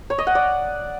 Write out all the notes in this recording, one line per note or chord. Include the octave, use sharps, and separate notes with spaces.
C#5
D#5
F#5
D5